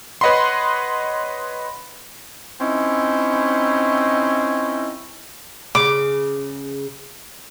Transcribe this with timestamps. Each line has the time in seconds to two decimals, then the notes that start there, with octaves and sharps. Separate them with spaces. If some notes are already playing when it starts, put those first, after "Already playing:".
0.21 B4 C#5 D#5 F#5 B5 C6
2.61 C4 C#4 D#4 E4
5.75 C#3 D6